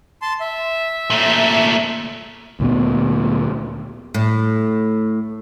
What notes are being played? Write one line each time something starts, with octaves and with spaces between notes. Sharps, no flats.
A5 C6
E5
A#2 A3
D2 A#2 B3
A2